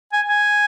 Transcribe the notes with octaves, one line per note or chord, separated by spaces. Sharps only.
G#5
G#5